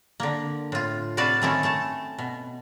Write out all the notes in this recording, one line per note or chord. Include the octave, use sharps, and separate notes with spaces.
D3 A#3
A2 F4
C3 F#4 B4 D5 F5 A5
D#3 A3 C4 C#4 E4 A4
A3 A4 A5
B2